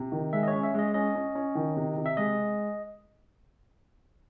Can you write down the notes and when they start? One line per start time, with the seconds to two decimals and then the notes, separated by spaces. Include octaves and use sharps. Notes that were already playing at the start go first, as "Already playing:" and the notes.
Already playing: C3
0.12 D#3
0.33 G#3 E5
0.43 D#5
0.48 C#5
0.53 C#4
0.63 E5
0.74 G#3 D#5
0.94 C#4 D#5
1.15 C#4
1.35 C#4
1.55 D#3
1.76 C3
1.96 C3
2.06 E5
2.17 G#3 D#5